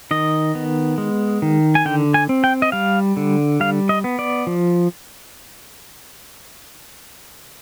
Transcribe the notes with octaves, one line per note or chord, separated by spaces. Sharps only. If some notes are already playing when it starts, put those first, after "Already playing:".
D#3 D#5
B3
G#3
D#3
G#5
D3 G5
G#5
C4
G5
D#5
G3 F5
D3
G3 F5
D#5
B3
D5
F3